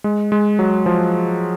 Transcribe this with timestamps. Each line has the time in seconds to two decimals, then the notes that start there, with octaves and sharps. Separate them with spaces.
0.04 G#3
0.32 G#3
0.59 F#3
0.86 F3